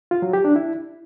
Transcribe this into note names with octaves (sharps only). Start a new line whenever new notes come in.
F4
F#3
G4
D4
E4